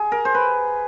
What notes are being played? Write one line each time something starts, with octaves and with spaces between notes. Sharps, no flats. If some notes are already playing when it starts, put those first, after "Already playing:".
Already playing: G#4
A#4
C5
B4